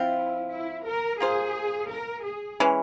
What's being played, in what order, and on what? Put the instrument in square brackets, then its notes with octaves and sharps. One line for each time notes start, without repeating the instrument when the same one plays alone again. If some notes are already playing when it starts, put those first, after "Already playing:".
Already playing: [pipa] F3 C4 F4 [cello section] E4
[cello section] E4
A#4
[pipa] A#3 F4 C5 [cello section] G#4
[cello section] A#4
G#4
[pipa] E3 G#3 C#4